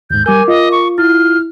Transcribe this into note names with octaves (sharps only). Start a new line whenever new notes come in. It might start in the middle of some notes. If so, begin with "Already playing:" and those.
D#2 G#2 G6
G3 A#4 G#5 D6 G6
F4 D#5
C#6
E4 F6